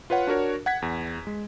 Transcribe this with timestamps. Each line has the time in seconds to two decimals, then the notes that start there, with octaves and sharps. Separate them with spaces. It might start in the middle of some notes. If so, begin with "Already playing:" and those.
0.10 F4 B4 C#5 F#5
0.27 D4 F#4 A#4 C#5
0.66 F#5 G#6 B6
0.82 E2
1.27 G#3